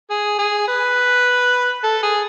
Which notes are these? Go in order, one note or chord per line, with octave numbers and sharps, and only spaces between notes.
G#4
G#4
B4
A4
G#4